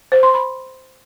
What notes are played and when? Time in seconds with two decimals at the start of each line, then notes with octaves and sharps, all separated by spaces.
0.12 C5
0.23 C6
0.34 B5